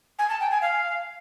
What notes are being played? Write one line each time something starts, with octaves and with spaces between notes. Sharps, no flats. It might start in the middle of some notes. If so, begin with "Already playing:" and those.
G#5
A5
G5
G#5
F5